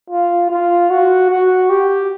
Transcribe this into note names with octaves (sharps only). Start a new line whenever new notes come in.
F4
F4
F#4
F#4
G4